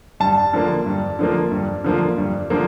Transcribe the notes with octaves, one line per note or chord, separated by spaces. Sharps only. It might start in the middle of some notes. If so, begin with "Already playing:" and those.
G2 A5
D3 F3 A#3
G2
D3 F3 A#3
G2
D3 F3 A#3
G2
D3 F3 A#3